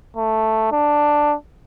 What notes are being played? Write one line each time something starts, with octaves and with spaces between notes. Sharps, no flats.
A3
D4